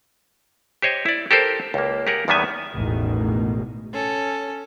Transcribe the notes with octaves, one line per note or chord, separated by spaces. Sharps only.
G4 C5 C#5 D#5
E4 D5
G4 A4 A#4 C5
C#2 A#3
G4 G#4 A#4 F#5
E2 D#3 G3 B3 E5 G#5
A1 E2 B2 D#3 G#3
C#4 A4